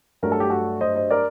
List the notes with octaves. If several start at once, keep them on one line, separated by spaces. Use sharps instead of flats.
G2 F#3 A3 A#4
A4
G4
F#4 A4
C5 D#5
C5 D#5
A#4 D5